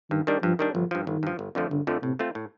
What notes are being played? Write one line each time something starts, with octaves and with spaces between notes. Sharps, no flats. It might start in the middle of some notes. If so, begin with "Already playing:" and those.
G2 D#3
D#3 G3 D4
G2 F3
D#3 G3 D4
G1 F3
G2 F3
G1 D#3
G2 F3
G1
F2 D3 F3 A3
G1 D3
F2 D3 F3 A3
A2 C3
A3 C4 F4
A2